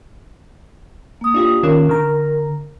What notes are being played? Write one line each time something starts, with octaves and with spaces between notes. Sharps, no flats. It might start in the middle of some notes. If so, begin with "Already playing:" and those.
A#3 D#6
D4 F4 G4
D#3 C#4 F4 A#4
D3 A#5